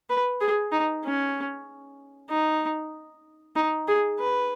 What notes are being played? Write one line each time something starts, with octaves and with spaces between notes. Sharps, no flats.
B4
G#4
D#4
C#4
D#4
D#4
G#4
B4